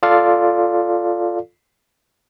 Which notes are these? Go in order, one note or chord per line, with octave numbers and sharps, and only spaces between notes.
F4 A4 D5 F5